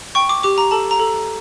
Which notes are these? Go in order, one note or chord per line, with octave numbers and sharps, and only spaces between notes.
G5 C#6
D6
G4 D6
A#5
A4 A5
A#5
A4